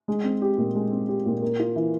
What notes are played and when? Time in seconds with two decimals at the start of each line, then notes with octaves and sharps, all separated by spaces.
0.08 G#3
0.24 C4
0.42 G4
0.58 A#2
0.75 G#3
0.91 C4
1.08 G4
1.26 A#2
1.42 A#3
1.60 F4
1.76 E3